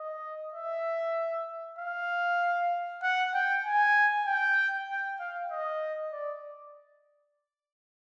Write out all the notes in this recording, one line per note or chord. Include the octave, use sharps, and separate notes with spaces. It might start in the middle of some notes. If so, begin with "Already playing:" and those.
Already playing: D#5
E5
F5
F#5
G5
G#5
G5
G5
F5
D#5
D5